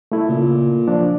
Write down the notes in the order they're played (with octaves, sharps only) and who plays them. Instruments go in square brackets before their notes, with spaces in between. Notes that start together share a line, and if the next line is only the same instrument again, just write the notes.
[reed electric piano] A3 E4 A4
[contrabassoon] A#2 [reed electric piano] C#3
[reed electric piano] F3 D4